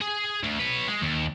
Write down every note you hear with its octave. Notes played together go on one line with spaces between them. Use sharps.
G#4
D2
B4 C#5
G#3
D#2